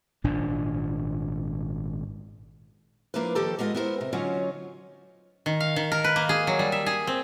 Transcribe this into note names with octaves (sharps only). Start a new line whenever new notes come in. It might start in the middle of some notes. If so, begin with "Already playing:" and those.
G#1 A#2 D4
F3 A#3 D4 E4 B4
D#3 F3 G4 A4
G#3 B3 E4 F4 D5 D#5
B3 E4 A#4 C5
C3
D3 F#3 C#4 D#4 F4 C#5
D#3
F5
D#3
A#4
B4
A#3
G#4
F#3
G3
E5
G#4
C4